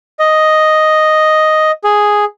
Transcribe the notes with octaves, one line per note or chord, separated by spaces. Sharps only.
D#5
G#4